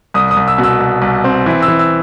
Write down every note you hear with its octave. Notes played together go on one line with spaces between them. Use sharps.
C2 D#6
D#6
C2
E6
B2
E6
C2
C2
C4
E3
E6
E3
E6